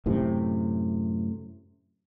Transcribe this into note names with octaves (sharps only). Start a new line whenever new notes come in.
F#2 A2 C3